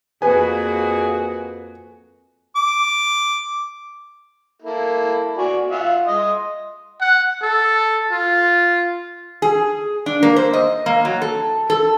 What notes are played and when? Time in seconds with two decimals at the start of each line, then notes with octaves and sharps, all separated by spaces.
0.22 F2 A#3 F#4 G#4 B4 G#5
2.56 D6
4.62 A#3 E4 A4
5.37 F#4 D5 G#5
5.71 F4 E5 F#5
6.07 D#5 C6 D#6
7.00 F#5
7.42 A4
8.11 F4
9.42 G#4
10.06 D4
10.23 A#3
10.36 C5
10.53 D#5
10.86 A#3
11.05 F#3
11.22 A4
11.70 A4